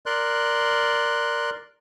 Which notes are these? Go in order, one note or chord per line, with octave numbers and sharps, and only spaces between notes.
A#4 D5 C6 F#6